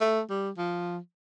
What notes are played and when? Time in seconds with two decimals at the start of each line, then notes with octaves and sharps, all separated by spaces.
0.01 A3
0.30 G3
0.58 F3